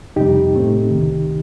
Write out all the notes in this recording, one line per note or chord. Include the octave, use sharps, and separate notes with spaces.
F2 C3 G3 D#4 G4
A2 A3 C4
C2 C3 D#3